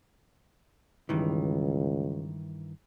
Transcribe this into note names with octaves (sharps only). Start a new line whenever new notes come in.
C#2 G2 D#3 E3